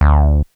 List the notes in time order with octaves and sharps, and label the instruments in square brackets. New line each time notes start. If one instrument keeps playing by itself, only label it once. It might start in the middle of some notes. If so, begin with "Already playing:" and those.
[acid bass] D2